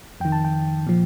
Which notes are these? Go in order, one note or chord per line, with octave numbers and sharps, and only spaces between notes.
F2 D#3 G5
A5
G5
A#2 F3